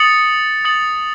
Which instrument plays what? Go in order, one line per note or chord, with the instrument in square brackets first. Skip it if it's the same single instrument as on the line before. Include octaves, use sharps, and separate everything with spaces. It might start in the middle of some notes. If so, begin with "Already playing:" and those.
Already playing: [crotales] D#6 A6 C#7 F#7
D#6 A6 C#7 F#7